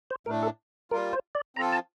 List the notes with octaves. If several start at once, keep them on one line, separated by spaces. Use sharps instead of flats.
C5
A2 A3 D4 A#4
A4
G3 A#3 F4 A#4
C5
D5
F3 C4 F4 A4 A#5
A5